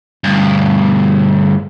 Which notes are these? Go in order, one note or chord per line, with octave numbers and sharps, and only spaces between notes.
D2 G2